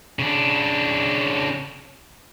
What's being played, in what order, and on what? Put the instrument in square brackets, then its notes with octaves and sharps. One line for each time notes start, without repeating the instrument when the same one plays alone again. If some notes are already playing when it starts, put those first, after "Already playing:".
[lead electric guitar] C#3 D4